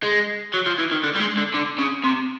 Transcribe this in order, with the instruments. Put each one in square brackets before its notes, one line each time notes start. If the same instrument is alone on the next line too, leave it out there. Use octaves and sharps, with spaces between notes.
[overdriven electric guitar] G#3
F#3
F3
E3
D#3
D3
G3
G#3
D3
D3
C#3
C3